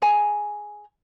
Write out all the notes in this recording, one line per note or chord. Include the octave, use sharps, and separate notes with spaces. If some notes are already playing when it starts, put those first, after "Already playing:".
G#4 C#5 G#5 A#5